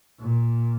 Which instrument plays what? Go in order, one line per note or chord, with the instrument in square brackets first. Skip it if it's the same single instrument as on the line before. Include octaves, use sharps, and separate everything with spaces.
[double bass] A#2